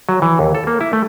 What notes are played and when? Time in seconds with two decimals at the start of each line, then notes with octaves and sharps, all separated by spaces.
0.09 F#3
0.22 E3
0.39 D#2
0.55 A4
0.67 A#3
0.81 E4
0.93 A3